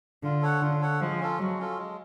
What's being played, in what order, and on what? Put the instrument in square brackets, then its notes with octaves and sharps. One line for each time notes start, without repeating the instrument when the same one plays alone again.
[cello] D3 [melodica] F4
[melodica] A4 C#5 F#5
[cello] D3 [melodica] F4
[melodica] A4 C#5 F#5
[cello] F3 [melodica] G#3
[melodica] C#4 F4 A4
[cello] F#3 [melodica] G#3
[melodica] C#4 F4 A4
G#3